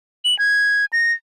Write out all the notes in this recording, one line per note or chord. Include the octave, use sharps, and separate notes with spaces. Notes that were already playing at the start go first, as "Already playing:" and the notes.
F#7
G#6
A#6